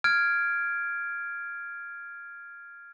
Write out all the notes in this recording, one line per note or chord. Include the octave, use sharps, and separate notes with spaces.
F6 G#6 D7